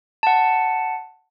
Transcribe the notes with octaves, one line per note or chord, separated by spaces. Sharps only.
F#5 A5